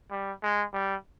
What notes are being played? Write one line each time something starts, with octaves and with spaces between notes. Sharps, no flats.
G3
G#3
G3